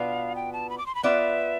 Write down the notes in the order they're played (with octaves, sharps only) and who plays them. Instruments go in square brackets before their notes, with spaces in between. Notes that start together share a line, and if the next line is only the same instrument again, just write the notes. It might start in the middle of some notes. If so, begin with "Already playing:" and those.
Already playing: [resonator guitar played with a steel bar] B2 B3 D4 F4 B4 [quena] F5
[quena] G5
A5
B5
D6
C6
B5
[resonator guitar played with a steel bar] B3 F4 B4 D5 [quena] E5